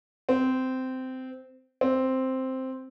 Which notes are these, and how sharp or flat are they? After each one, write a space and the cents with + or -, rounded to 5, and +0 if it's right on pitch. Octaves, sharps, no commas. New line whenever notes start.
C4 -15
C4 +0